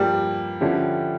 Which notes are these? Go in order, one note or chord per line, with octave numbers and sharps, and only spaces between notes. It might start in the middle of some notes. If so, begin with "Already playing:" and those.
Already playing: G2 F3 G3 A#3
D3 F3 C#4 E4 G4